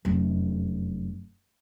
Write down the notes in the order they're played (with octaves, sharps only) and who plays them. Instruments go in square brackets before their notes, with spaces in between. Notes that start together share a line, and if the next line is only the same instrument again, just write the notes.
[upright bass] F1 F#2